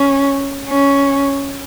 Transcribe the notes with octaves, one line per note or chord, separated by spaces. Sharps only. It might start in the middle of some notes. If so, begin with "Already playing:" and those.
Already playing: C#4
C#4